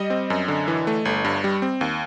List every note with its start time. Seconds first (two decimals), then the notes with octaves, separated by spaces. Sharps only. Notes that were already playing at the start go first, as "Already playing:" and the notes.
Already playing: G3 D#5
0.10 C4
0.30 F#2
0.48 D3
0.68 E3
0.87 A3
1.05 G1
1.25 G2
1.44 G3
1.62 C4
1.81 D#2